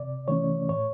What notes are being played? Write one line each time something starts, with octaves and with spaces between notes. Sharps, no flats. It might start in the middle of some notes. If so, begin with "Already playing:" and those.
Already playing: C3 D5
E3 A3 C#4 C#5
A2 C#5